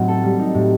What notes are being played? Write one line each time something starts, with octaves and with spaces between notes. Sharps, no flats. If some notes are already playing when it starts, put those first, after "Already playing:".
Already playing: A2 F#3 C4 D#4
A4
G3
D#4
A2